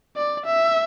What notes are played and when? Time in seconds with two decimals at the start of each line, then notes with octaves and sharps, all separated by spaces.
0.16 D5
0.46 E5